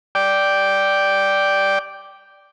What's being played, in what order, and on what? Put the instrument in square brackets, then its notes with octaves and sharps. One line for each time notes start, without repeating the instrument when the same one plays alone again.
[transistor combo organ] D5 G5